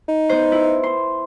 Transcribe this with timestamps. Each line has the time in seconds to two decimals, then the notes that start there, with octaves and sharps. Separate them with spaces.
0.08 D#4
0.29 B3 C5
0.52 E4
0.83 C6